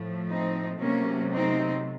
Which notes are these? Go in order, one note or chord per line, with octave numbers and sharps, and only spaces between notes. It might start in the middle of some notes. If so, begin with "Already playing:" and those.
Already playing: A2 F3 A3
C4 D#4
C3 F#3 A3 A#3 C#4
C4 D#4